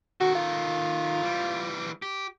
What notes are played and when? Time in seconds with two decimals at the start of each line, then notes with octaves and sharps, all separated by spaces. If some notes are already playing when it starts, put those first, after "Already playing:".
0.21 D#3 F#4 A4
0.35 F4
1.23 E3 G3
2.02 G4